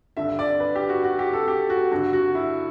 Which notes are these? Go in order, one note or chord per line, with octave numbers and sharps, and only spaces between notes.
G2 D3 E5
D5
B4
G4
F#4
F#4
G4
A4
G4
F#4
G2 D3 F#4
F#4
E4